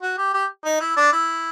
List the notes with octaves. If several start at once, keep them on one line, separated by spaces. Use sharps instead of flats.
F#4
G4
G4
D#4
E4
D4
E4